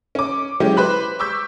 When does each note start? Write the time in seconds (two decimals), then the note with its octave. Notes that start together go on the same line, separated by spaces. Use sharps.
0.15 C#4 D6
0.60 F#3 G#3 C#4 E4 G4
0.77 B4 C5 B5 F#6
1.19 C#6 D6 E6 G6 B6